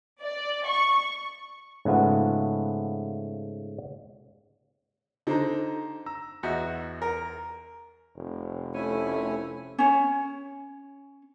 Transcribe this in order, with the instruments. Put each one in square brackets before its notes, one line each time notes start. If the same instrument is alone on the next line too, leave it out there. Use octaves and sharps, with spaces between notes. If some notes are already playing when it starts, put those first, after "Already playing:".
[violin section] D5
C#6
[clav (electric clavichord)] G#2 C#3 A3 B3 F4
[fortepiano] D3 [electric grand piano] D#4 C5 A#5
[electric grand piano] A#5 E6
[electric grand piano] E2 G6 C#7 [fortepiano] F#4 D#5 E5
[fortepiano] A#4
[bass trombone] F1
[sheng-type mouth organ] A3 E4 G#5 [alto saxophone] C#4
[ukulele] C#4 C#5